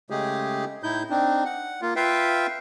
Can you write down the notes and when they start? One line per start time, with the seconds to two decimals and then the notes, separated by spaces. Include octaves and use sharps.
0.10 C#3 G#3 A3 G4 G#4
0.83 A2 D#4 E4 G6
1.10 C4 D4 D#4
1.45 F#5
1.82 A#3 F4
1.96 F4 B4 E5 F5 G5